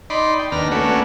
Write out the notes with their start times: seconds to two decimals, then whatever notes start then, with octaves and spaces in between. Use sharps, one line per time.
0.10 D#4 D5 B5 C6
0.39 G5
0.52 D#2 B3 D4 A#5 F6
0.71 A3 A#3 C#4 D4 F#4 B4